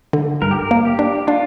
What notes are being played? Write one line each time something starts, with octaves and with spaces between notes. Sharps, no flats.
D3
G2 A#4
G4
A#4
A#3
G4
D4
D4 F4